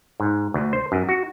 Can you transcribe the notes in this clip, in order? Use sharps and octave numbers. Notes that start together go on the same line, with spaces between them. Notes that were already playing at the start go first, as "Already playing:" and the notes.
G#2
D2
C5
F#2
F#4